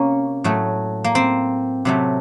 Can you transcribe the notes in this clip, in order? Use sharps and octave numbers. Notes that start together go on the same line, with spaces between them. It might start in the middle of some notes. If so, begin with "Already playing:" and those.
Already playing: C3 A#3 C#4
A2 F#3 A3
A#3
C4
C3 F#3 A3